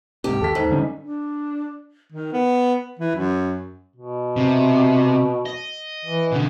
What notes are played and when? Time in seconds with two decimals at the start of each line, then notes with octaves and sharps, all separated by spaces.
0.24 G#2 C3 G4
0.41 D#2 A4 B6
0.55 G#2
0.70 D3 G3 C#4
0.99 D4
2.12 D#3
2.33 B3
2.99 E3
3.15 F#2
3.96 B2
4.36 C3
5.46 D#5
6.05 E3
6.32 B2 D3